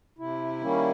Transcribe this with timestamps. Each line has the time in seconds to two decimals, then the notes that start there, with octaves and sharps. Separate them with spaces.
0.18 C3 E4
0.61 D#3 G3 A#3 C#4